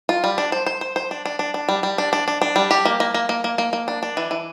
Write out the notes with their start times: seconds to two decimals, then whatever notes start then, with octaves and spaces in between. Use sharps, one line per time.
0.09 F4
0.24 G3
0.38 D4
0.52 C5
0.66 C5
0.81 C5
0.96 C5
1.11 D4
1.26 D4
1.39 D4
1.54 D4
1.69 G3
1.83 G3
1.98 D4
2.13 D4
2.28 D4
2.42 D4
2.56 G3
2.71 G4
2.85 A#3
3.00 A#3
3.14 A#3
3.29 A#3
3.44 A#3
3.58 A#3
3.73 A#3
3.88 D4
4.03 D4
4.17 E3
4.31 E3